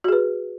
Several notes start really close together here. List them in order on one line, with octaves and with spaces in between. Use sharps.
F#4 G#4 B4